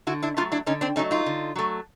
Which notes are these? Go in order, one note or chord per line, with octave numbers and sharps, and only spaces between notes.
D3 E4 F#4
D4 E4
F#3 A3 D#4 F4
D4 E4
D3 C#4 D#4
C4 D4
F#3 A3 C#4 D#4
D#4 F4
D3
F#3 A3